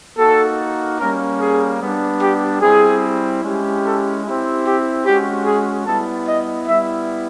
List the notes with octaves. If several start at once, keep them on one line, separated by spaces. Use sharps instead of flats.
A#3 D#4 F#4 A4
G3 A#3 C#4 A#4
G#4
G3 B3 D4
G4
G3 C4 E4 G#4
G#3 C#4 E4 G4
A4
C4 E4 G4
G4
G#3 C#4 F#4 G4
G#4
G3 B3 E4 A4
D#5
G3 B3 E4 E5